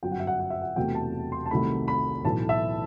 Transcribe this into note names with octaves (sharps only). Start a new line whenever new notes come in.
G1 F#2 F#3 G5
F#5
E5
F#5
F#5
E5
F#5
E1 E2 C3 F#3 A3 G5
A5
C6
A5
C2 C3 D#3 F#3 A3 B5
B5
B1 A2 E3 A3 A5
E5